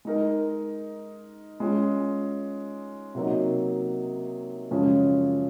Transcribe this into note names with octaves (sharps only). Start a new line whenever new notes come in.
G#3 D#4 A#4
G#3 C#4 F4 G#4
C3 F#3 A#3 D#4
F#2 C#3 F3 G#3 C#4